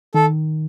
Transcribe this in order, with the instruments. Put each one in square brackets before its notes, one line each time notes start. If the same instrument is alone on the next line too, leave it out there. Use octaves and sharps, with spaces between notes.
[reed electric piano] D#3 [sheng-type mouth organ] A4